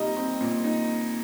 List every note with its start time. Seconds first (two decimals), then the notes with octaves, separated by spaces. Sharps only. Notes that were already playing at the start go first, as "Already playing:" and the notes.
Already playing: A#2 G3 C4 D#4 D#5 A#5
0.17 C4
0.41 A#2
0.64 D#4